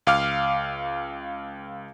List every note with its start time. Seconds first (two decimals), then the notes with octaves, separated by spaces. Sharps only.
0.07 C#2 F5 D6 F6